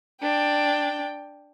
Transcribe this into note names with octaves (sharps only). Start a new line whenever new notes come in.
D4 G5